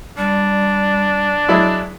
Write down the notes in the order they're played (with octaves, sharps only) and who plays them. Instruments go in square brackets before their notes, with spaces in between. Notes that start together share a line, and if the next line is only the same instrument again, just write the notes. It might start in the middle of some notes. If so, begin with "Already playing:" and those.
[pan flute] G3 [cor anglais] D4
[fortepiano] F#3 G#3 E4